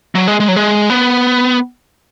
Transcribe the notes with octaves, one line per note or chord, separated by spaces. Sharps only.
F#3
G#3
G#3
F#3
G#3
B3